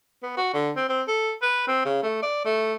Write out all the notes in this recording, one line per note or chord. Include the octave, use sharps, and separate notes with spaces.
B3
F#4
D3
C4
C4
A4
B4
C4
C#3
A3
D5
A3